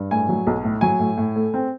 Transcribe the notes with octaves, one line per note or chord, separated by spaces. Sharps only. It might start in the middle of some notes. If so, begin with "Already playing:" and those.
Already playing: G2
A2 G#5
F#3
B1
A2
F#3 G#5
A2
A2
A3
C4